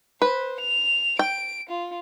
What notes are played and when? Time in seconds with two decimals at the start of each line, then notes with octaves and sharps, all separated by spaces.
0.22 B4 C5
0.60 F7
1.19 G5 D7
1.69 F4